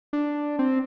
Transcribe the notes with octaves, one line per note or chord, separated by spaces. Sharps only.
D4
C4